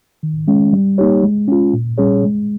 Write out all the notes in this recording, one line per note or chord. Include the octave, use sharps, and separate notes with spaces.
D#3
G#3 C#4
G3
A#3 D#4 G4 C#5
G#3
C#4 F4
A#2
G3 C#4 G#4 C#5
G#3